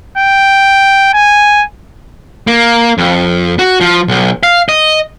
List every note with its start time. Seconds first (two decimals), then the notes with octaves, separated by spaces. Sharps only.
0.17 G5
1.13 G#5
2.47 A#3
2.98 F2
3.59 F#4
3.81 F3
4.08 B1
4.43 F5
4.69 D#5